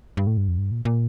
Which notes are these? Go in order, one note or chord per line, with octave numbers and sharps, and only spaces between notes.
G2
A2
G2
F2
G2
A#2
A#2